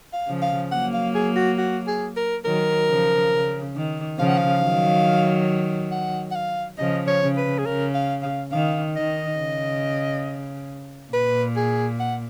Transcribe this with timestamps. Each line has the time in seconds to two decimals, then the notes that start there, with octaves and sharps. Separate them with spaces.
0.13 F5
0.28 C#3 F3
0.42 F5
0.72 F#3 A#3 F#5
0.94 F5
1.15 G#4
1.36 F#4
1.58 F#4
1.87 G#4
2.16 A#4
2.45 D#3 F#3 A#4
2.88 C#3 F3
3.32 C#3
3.75 D#3
4.18 C#3 F3 F5
4.28 F#5
4.38 F5
4.62 D#3 F#3
5.92 F#5
6.32 F#5
6.35 F5
6.78 C#3 F3 D#5
7.08 C#5
7.22 C#3
7.37 B4
7.58 G#4
7.66 C#3 A#4
7.95 F5
8.23 F5
8.52 D#3 F5
8.96 D#3 D#5
9.39 C#3
11.13 A#2 B4
11.56 G#4
12.00 F#5